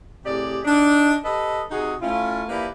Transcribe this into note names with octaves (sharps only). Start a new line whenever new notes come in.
A2 C3 G4 G#4 D5
D4 D#4
G4 A4 B4 D#5
C3 D#4 F#4 G#4
A3 C#4 E4 F4
F3 A#3 E4 G4 B4 D5